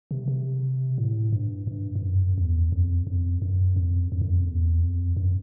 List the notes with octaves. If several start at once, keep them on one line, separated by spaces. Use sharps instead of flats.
C3
C3
A2
G2
G2
G2
F#2
E2
F2
F2
F#2
F2
F2
F#2
F2
E2
F2
F#2